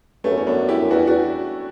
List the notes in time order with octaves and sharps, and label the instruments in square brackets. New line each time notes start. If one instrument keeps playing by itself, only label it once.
[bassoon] G2 [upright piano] A3 C#4
[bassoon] F#2
[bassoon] E2 [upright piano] C#4
[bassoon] F#2 [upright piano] B3 D4
[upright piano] E4 G4
[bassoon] F#2
[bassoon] E2 [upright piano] D4 F#4
[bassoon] E2 [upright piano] D4 F#4